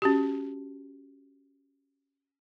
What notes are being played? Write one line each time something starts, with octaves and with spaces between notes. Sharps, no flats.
C#4 F#4 G4